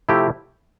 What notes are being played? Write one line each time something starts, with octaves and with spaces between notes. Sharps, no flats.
C3 F3 A3 C4 E4 G4